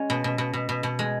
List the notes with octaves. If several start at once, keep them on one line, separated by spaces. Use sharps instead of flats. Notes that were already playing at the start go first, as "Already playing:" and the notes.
Already playing: G#3 C#4
B2
B2
B2
B2
B2
B2
G#3